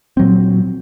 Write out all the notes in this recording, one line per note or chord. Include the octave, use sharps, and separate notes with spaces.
A#2 F#3 C4